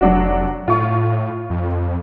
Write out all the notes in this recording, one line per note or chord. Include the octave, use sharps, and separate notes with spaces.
F1 F#3 D4 F#4
A2 F4 C#6
F2